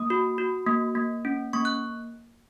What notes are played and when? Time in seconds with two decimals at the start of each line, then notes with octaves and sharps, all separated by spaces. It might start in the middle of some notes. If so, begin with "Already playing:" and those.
Already playing: A#3 D#6
0.10 F#4
0.38 F#4
0.67 A#3
0.95 A#3
1.25 C#4
1.53 A#3 C#6
1.65 F#6